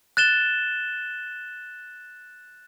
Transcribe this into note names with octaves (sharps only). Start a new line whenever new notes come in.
F#6 A6 E7 G7